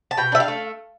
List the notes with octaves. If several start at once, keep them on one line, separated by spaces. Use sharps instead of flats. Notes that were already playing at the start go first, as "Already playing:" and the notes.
A5
B2 G5
D4 E5
F5
A3